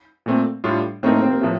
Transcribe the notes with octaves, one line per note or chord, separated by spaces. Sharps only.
A#2 A3 C4
A2 G3 D4 F4
A2 A3 C4 D#4 A#4
A#3
C4
A#3
A2 F3 A3